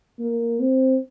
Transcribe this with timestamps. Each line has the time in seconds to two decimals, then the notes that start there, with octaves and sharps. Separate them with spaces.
0.19 A#3
0.60 C4